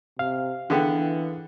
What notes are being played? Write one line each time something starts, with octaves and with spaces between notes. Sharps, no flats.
C3 F5
D3 E3 B3 D4 G#4 G5